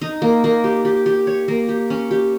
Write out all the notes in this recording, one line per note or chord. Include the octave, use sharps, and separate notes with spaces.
D#4
A#3
A#3
G4
G4
G4
C#5
A#3
G4
C#4
G4